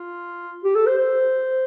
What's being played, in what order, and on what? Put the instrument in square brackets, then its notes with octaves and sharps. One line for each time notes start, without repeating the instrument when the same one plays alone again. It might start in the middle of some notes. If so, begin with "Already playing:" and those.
Already playing: [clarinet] F4
G4
A4
C5
C5